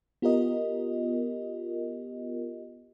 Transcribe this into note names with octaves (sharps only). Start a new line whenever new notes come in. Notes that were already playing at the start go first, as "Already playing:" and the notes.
B3 F4 G4 A#4 D#5